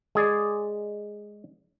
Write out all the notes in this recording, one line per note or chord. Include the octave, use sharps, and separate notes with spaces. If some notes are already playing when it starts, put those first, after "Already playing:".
G#3 G#4 D5